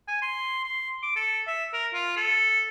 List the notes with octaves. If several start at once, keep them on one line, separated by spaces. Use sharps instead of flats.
G#5
C6
C6
D6
A4
E5
A#4
F4
A4